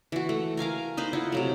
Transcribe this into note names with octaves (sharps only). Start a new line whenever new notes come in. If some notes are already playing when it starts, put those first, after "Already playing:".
E3 F#4
A3
A#4 F5 G#5 A#5
D#4 B4 C5
E4 F4 F#5
C3 F#3 A3